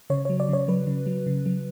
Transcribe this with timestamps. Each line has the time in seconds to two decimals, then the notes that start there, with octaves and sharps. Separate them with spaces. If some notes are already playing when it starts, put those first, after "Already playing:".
0.10 C#3 C#5
0.25 F#3 C#5
0.40 D5
0.49 C#3 C#5
0.68 F#3 B4
0.87 C#3
1.06 F#3
1.27 C#3
1.46 F#3